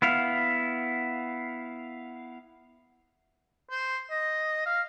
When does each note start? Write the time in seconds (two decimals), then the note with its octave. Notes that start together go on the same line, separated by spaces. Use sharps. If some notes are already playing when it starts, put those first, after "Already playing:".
0.02 B3 E4 F5
3.71 C5
4.10 D#5
4.66 F5